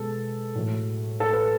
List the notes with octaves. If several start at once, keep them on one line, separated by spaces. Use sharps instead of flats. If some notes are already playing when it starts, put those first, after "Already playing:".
Already playing: B2 G#3 B3 G#4 A4
A2 F#3 A3
A4
B4